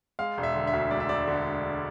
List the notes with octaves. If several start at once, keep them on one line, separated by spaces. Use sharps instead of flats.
G#3 F5
E1
E5
D3
E5
D2
G#3 D5
E5
E1 D5
D3